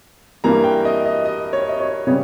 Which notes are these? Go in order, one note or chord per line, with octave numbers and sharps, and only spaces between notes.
G2 E3 A#3 A#5
G5
D#5
D#5
D#5
C#5
D#5
C#5
C#3 G3 B3 C#5